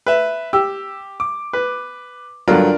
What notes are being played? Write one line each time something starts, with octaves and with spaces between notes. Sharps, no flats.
B4 E5
G4 E6
D6
B4
G2 D3 F#3 D4 F4 A#4